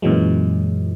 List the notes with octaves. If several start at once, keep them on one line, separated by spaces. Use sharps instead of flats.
F#2 A#2 E3 F#3 G#3